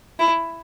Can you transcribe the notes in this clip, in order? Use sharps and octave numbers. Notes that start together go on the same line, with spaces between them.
E4